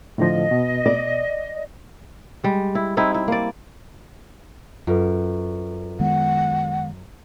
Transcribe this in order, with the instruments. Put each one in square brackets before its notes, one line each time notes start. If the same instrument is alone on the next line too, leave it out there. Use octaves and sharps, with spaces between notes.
[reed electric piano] A2 D3 F3 [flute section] D#5
[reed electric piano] B2
[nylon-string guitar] D5
[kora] G3 G#3
E4
C4 D#4 E4
E4
A#3 D5
[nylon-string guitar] F#2 [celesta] F4 A4 B4
[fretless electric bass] D#3 G#3 B3 [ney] F#5